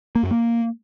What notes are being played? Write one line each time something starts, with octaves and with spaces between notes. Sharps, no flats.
A#3
F#2
A#3